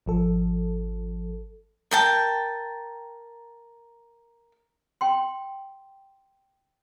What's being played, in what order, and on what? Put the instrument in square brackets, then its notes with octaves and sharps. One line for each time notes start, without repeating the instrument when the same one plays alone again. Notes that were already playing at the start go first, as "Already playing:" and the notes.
[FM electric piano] G#1 F3 A4
[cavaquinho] A#4 G5 A5
[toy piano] G5 C6